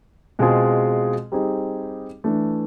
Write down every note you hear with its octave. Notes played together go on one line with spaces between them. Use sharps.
B2 G#3 C4 F4 G#4
G3 C4 D#4 G#4
E3 A3 D4